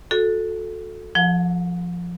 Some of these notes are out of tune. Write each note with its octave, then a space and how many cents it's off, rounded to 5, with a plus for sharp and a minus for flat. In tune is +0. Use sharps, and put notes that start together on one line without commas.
F#4 -30 A4 -5
F3 +0 F#5 -35 A5 +0